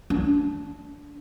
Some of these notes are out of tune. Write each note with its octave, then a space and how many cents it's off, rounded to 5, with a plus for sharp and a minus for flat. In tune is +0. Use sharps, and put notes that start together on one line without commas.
D4 -20